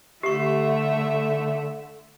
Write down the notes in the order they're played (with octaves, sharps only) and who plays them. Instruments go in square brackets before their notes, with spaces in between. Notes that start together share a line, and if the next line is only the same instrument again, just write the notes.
[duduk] D3 [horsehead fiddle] A3 E5 [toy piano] G4 C#6